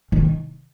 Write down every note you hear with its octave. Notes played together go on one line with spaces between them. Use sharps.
D#3